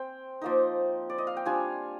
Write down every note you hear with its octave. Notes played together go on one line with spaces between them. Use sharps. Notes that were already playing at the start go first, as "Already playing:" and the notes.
Already playing: C4 C5 G5
F3 A#3 D#4
D5
D#5
F5
G5
G3 D4 F4 G#5